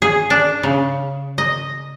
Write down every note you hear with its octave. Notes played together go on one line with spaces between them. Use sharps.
G#4
D4
C#3
D#5